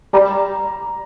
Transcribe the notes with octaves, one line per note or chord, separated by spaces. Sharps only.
G3 A#5